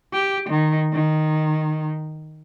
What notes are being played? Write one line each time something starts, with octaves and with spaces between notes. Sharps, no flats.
G4
D#3
D#3